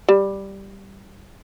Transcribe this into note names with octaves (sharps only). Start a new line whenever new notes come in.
G3